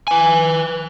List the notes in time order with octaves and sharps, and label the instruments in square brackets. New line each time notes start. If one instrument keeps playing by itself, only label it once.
[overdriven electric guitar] B4 G#5